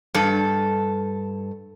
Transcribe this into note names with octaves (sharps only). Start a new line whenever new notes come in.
G2 A4